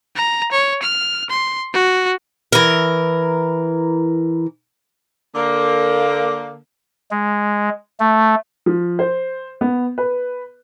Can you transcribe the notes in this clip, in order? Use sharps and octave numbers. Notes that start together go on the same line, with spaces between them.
A#5
C#5
F6
C6
F#4
E3 A#4
D3 A#3
G#3
A3
F3
C5
B3
B4